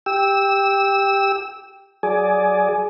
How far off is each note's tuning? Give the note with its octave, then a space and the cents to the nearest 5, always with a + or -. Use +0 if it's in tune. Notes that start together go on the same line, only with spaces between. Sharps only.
G4 +10 E6 -15
F#3 +10 G#4 +15 D5 +0